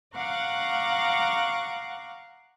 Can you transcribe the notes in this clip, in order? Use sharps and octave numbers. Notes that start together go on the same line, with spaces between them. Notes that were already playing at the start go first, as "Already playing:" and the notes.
F5 F#5 A#5 C#6 D6 F#6